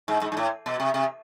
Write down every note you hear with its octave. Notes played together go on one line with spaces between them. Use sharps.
G#2
G#2
G#2
A2
B2
C3
C3